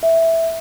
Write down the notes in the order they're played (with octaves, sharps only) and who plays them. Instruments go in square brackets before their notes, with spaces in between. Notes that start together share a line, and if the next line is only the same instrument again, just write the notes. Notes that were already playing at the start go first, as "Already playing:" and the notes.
[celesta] E5